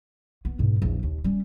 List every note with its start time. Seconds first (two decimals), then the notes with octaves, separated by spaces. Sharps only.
0.45 B3
0.59 G#2 B2
0.82 A#1 E2
1.03 D#2
1.24 G3 C#4